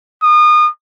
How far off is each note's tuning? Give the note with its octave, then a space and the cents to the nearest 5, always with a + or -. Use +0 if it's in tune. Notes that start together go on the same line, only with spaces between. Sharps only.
D#6 -30